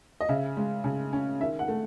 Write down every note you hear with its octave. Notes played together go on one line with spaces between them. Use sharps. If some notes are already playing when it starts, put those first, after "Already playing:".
D#5
C#3 E5
G#3
C#3
C#4
D#3 E5
F#5
A3